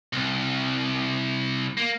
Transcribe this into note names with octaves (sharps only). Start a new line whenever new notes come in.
C2
A#3